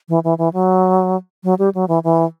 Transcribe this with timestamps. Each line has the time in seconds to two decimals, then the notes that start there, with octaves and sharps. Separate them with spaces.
0.09 E3
0.24 E3
0.38 E3
0.53 F#3
1.44 F#3
1.59 G3
1.74 F#3
1.88 E3
2.04 E3